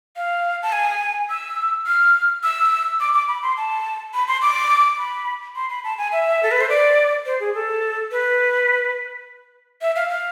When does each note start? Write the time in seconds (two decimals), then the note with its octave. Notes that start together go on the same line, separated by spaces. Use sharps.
0.16 F5
0.63 A5
0.72 G#5
1.30 E6
1.86 F6
2.43 E6
3.00 D6
3.14 D6
3.28 B5
3.43 C6
3.57 A5
4.14 B5
4.28 C6
4.42 D6
4.98 B5
5.56 C6
5.70 B5
5.84 A5
5.98 G#5
6.12 E5
6.43 A4
6.51 B4
6.61 C5
6.69 D5
7.26 C5
7.40 G#4
7.55 A4
8.12 B4
9.81 E5
9.96 F5
10.10 F5